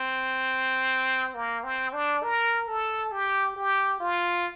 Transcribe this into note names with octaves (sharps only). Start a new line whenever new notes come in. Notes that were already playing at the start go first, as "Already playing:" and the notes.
Already playing: C4
A#3
C4
D4
A#4
A4
G4
G4
F4